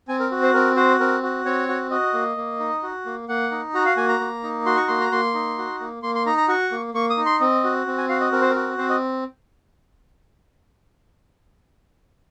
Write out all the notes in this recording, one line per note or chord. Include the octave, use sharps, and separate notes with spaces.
C4 G#5
A#4
F#4
C5
C4 A#4
F#4 C5
C4 A#4
F#4
C4 C#5
F#4
F#4 D#5
A#3
A#3
D#4
F#4
A#3
A#3 F#5
D#4
F#4 A#5
F5
A#3 G#5
A#5
A#3
D#4
F#4 C6
C#6
A#3 C6
A#5
A#3 C6
D#4
F#4
A#3
A#3 C6
C6
D#4 A#5
A#5
F#4 C#6
A#3
A#3 C#6
D#6
D#4
C6
C4 D#5
F#4
C4
G#5
F#4 F5
D#5
C4 A#4
C5
F#4 A#4
C4 C5
D#5